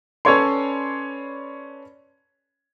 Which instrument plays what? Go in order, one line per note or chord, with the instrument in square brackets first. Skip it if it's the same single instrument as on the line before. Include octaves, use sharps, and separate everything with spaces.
[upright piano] C#4 A4 B4 C#5 D5 C6